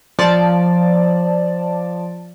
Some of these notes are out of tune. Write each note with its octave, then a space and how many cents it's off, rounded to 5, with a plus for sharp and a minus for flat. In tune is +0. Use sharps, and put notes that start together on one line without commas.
F3 +0 D5 +0 A5 +0